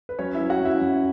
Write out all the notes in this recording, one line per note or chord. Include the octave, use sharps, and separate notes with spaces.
B4
F#3 C#4 C#5
F#3 E4 E5
F#4 F#5
F#2
E4 E5
F#2